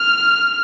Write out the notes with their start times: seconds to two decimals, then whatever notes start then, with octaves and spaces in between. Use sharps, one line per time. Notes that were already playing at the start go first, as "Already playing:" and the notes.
Already playing: F6